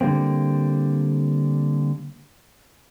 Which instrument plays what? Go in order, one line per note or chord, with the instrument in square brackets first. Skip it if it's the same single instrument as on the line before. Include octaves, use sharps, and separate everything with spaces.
[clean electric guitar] D3 G3 A#3 C4